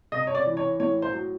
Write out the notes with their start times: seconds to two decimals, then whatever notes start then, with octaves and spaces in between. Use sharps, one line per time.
0.12 C3 D#5
0.27 C#5
0.35 D5
0.46 E3
0.57 C#5
0.80 A2 C#5
1.02 C5
1.14 F#3